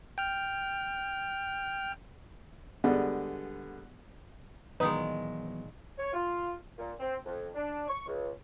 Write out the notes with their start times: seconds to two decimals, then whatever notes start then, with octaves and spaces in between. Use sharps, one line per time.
0.18 G5 F6
2.84 D3 G3 G#3 B3
4.80 A#2 D#3 E3 F#3 G#3 B3 D#4 B4
5.98 C#5
6.13 F4
6.78 A#2
6.99 C4
7.26 F2
7.54 D4
7.88 C#6
8.07 C#2